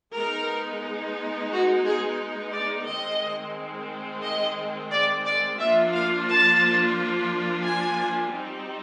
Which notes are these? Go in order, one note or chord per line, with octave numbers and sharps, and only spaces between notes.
G#3 B3 D#4 A#4
F#4
G#4
D5
D#3 G#3 C4 D#5
D#5
D5
D5
F3 A#3 D4 F4 E5
F5
A5
G#5
G3 C4 D#4